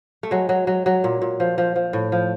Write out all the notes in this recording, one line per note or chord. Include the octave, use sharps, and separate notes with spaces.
A3
F#3 G#3
F#3
F#3
F#3
A#2
A#2
F3
F3
F3
A2
F3